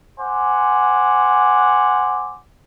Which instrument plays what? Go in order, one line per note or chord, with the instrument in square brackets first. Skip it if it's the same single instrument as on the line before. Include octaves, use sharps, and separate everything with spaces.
[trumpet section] C5 F#5 G#5 D6